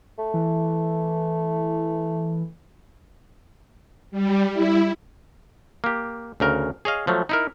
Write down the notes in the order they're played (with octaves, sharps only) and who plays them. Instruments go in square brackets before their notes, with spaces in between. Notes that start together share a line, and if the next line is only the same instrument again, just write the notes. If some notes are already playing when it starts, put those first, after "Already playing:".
[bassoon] A3
[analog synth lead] E3
[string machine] G3
E4
[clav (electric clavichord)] A#3 G4
D2 C#3 A#4
G#4 C#5 D#5 F5
F3 F#3 A3
D#4 E4 A#4